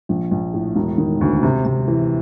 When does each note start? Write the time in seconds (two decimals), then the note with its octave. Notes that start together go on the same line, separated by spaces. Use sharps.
0.09 A#1
0.31 A#1
0.54 A2
0.75 E1
0.98 D#3
1.21 D2
1.43 C3
1.65 C3
1.88 E3